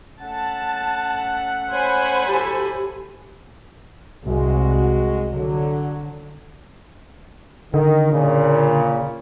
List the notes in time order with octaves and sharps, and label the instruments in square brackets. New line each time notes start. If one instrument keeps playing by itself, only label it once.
[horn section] A3 C#4 F#5 [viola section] A5
[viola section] C5 G#5 B5 [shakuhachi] C#5
[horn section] A2 F#3 A4 [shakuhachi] G4
[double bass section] C2 [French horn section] G#3 F#4
[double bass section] D3 [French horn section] F#3
[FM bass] D3 [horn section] D#3
[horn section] A#2 C#3